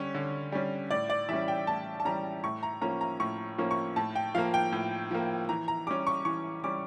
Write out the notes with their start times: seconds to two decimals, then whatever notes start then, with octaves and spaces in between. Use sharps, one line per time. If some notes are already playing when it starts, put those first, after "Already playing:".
Already playing: D3 G3 C#4 C#5
0.15 D3
0.52 G3 C#4
0.91 A2 D5
1.10 D5
1.29 E3 G3 C#4 E5
1.48 G5
1.67 A2 A5
2.00 A5
2.05 E3 G3 C#4 A#5
2.43 A2 C#6
2.63 A#5
2.81 F3 A#3 C#4 A#5
3.01 A#5
3.20 A2 C#6
3.58 F3 A#3 C#4
3.71 C#6
3.96 A2 A5
4.15 G5
4.35 F3 A#3 F5
4.54 G5
4.72 A2
5.11 F3 A#3
5.49 E3 A#5
5.68 A#5
5.87 G3 C#4 D6
6.07 C#6
6.25 E3 C#6
6.64 G3 C#4 D6